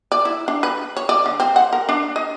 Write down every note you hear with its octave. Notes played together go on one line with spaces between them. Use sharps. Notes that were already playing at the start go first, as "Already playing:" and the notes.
D5
E4
D4
B4
C#5
D5
D3
C4
F#5
A#4
D4
D#5